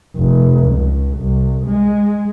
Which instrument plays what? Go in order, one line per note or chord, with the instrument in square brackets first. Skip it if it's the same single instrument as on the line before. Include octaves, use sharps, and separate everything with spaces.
[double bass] F1
C#2
C2
G#3